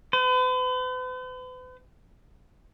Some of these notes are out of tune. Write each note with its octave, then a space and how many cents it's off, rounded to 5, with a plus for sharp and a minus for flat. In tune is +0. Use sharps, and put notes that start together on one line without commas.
B4 +45